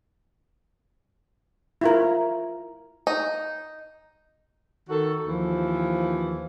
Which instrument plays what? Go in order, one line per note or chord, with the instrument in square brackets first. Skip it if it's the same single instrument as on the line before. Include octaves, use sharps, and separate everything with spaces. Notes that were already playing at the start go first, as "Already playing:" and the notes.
[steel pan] E4 F4 A#4
[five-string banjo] D#4
[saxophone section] D#3 F#4 A4
D#2 E3 F3